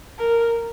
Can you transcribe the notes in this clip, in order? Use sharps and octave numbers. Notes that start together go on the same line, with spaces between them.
A#4